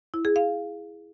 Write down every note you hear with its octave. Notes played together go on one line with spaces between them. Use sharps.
E4
G#4
F5